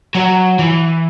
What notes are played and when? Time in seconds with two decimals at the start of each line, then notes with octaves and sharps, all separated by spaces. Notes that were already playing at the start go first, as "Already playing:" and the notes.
0.15 F#3
0.59 E3